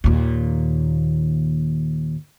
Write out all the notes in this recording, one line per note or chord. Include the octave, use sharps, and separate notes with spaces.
D#2 A#2